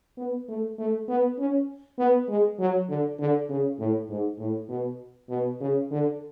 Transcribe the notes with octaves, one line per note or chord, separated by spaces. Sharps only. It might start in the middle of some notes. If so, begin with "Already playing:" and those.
B3
A3
A3
B3
C#4
B3
G#3
F#3
D3
D3
C#3
A2
G#2
A2
B2
B2
C#3
D3